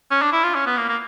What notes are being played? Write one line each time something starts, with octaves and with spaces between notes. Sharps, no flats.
C#4
D4
E4
F4
C#4
B3
A#3
A#3